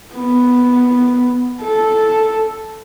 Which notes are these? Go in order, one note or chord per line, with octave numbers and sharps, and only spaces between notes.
B3
A4